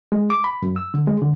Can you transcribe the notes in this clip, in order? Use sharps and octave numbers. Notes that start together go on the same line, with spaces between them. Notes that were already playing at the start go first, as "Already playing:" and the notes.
G#3
D6
B5
F#2
E6
D3
G#3
D3